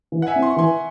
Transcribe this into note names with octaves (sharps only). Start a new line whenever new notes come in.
E3
F#5
E5 G#5
C4 E4
C6
C#6
E3 G#5 C6